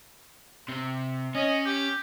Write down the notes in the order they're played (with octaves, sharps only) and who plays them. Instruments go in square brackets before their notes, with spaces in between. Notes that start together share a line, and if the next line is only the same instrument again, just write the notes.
[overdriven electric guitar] C3
[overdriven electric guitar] C#4 [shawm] D#5
[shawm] G4